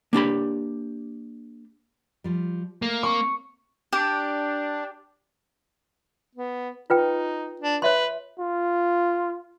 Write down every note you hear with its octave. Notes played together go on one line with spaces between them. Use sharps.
A#3 D4 G4 B5
F3 G3
A3 A#3
C4 C#6
D4 G4
B3
D#4 F4 B4 G5
D4
B4 C#5 E5 C6
F4